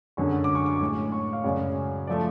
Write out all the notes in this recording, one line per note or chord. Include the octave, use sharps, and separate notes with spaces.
F#2 D3 G#3 C#6
D6
C#6
D6
A2 G#3
C#6
F5
F#2 C#3 G#3 D5
F3 A3 D5